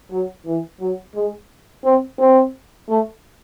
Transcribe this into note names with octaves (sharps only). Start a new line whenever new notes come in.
F#3
E3
F#3
G#3
C4
C4
A3